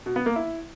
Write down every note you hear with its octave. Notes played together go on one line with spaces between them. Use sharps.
B2
B3
A#3
E4